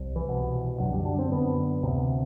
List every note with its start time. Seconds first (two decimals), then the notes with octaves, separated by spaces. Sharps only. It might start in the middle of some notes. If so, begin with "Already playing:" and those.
Already playing: C2
0.16 E3
0.29 C2 B2
0.79 F#2 D3 F#3
0.93 G3
1.05 D4
1.19 C4
1.31 F#2 D3 B3
1.83 D2 C3